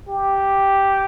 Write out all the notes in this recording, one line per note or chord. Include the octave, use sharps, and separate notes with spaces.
G4